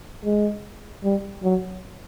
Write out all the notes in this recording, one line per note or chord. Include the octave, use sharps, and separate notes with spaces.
G#3
G3
F#3